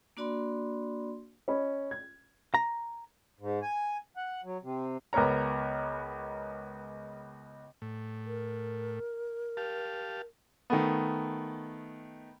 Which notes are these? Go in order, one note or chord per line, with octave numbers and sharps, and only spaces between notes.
A#3 D4 F#4 D5 B5 C6
C#4 D#5 B5
G#6
A#5
G#2
G#5
F#5
F#3
C3
C#2 B3 A#4 C#5 A#5
A2
A#4
G4 F5 A5
D#3 A3 B3